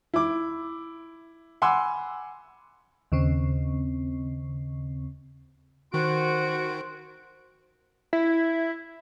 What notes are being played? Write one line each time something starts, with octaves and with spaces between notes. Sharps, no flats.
E4 D6
F#5 G#5 B5 C6 D6 E6
D#2 C#3 C4
D#3 F#4 C5 D7
E4